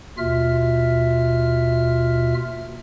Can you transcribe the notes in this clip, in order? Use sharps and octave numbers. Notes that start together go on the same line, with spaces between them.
D#2 B2 F4 E5 F6